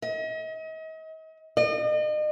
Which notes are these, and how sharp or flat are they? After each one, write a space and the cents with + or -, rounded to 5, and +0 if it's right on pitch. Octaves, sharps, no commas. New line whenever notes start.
D#5 +40
D#5 -40